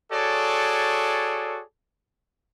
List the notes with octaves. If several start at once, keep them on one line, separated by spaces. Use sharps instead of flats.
F#4 G#4 A4 C#5 D5